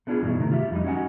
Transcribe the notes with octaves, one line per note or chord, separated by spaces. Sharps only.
A3 B3 D4 F4 G#4
G2 B2 E3 C4 D#4 E4
C3 D#3 A3
F4 G4 E5
F2 G3 D#4
C#4 D#4 F#4 D5 F#5 G#5